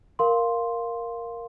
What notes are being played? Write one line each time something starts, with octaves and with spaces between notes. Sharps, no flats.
A#4 F5 C6